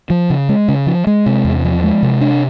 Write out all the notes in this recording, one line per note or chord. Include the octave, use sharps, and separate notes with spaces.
F3
C#3
G#3
C#3
F3
G#3
C3
E2
F3
G#3
C3
D4